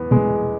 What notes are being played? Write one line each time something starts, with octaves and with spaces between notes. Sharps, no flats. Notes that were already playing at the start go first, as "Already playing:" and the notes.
Already playing: E2 B3
B2 G#3